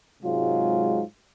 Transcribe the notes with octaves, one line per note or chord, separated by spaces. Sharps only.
G#2 C3 F#3 G#3 F4